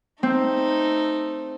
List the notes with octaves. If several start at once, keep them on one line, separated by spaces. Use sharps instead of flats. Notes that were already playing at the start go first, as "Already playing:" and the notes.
A3 C4 D#4